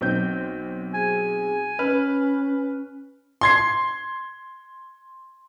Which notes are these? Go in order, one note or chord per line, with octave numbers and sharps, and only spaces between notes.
B1 C4 G6
G#4 G#5
C#4 B4 F6
C6 G#6 C7